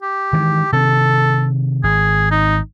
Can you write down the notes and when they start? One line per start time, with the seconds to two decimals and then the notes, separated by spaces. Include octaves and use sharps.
0.02 G4
0.33 D#3 E3 G#3
0.73 C3 D#3 A4
1.83 G#1 G#4
2.31 D#4